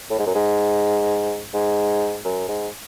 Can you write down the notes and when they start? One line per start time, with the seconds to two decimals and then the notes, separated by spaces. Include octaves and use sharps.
0.10 A2
0.19 G#2
0.27 F#2
0.35 G#2
1.54 G#2
2.25 F#2
2.49 G#2